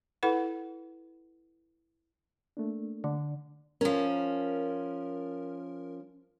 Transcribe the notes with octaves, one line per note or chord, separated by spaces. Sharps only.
E4 A4 B4 F#5 B5
A3 A#3 D4
D3
F3 C#4 A#4